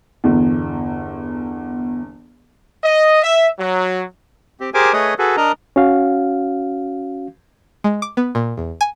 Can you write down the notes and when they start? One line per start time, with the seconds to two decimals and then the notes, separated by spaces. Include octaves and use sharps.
0.24 G1 E2
2.83 D#5
3.22 E5
3.59 F#3
4.60 C4 G4
4.74 G4 G#4 A#4 C5 G#5 D6
4.93 A3 G#4 B4 C#5 D#5 D#6
5.18 F#4 G#4 A4 B4
5.37 D4 A#4 D#5 A#5
5.76 C#4 F#4 F5
7.84 G#3
8.02 D6
8.17 B3
8.35 A#2
8.57 E2
8.81 G#5